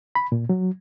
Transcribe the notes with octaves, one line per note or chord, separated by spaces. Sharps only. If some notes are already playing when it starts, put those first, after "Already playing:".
B5
A#2
F#3